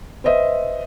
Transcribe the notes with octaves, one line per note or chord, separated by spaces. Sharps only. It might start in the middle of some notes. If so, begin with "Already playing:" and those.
B4 C5 D#5 E5